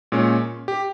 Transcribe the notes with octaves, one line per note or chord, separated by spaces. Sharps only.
A#2 G#3 C#4
G4